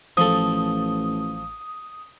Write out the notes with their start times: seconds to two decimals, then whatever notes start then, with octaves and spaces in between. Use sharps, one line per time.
0.17 A1 F3 A4 D#6